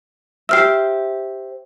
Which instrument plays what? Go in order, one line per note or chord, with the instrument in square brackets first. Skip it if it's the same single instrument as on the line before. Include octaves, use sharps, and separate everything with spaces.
[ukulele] G4 C5 E5 [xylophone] E6 F6 C7